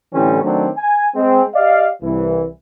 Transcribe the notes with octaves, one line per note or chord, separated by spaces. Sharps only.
A2 D3 E3 G3 C4 C#4
D#3 F#3 A3 C4 D4
G#5
G#3 C4
G4 D5 D#5 F5
C2 E3